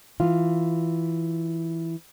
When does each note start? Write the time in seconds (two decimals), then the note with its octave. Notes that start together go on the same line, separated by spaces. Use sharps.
0.20 E3 F4